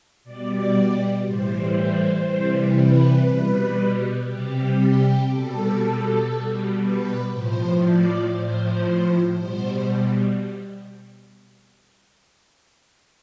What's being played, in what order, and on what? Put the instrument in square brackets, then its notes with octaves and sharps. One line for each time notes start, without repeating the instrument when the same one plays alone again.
[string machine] B2 G3 D5
A2 E3 G3 C5
C5
C3 E3 G3
B4
B2 G3
C3 G3 G4
G4
B2 G3 A4
B2 G3
B4
A2 F3 C5
D5
A2 F3 C5
B2 G3 C5